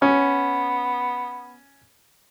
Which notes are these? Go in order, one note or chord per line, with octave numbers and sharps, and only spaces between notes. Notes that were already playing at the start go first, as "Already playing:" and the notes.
B3 C#4